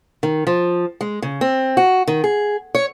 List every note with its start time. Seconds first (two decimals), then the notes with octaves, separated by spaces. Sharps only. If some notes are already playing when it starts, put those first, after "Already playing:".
0.23 D#3
0.47 F3
1.01 G#3
1.22 C#3
1.41 C4
1.77 F#4
2.08 D#3
2.24 G#4
2.75 C#5